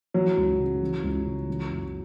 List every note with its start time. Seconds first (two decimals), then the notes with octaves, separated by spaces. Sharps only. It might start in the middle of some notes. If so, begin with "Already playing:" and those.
0.14 E3 F#3
0.37 C#2
0.59 C#3
0.82 E3
1.03 C#2
1.25 C#3
1.48 E3
1.70 F#1